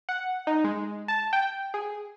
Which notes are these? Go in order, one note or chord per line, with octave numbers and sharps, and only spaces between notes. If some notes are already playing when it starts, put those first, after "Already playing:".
F#5
D#4
G#3
A5
G5
G#4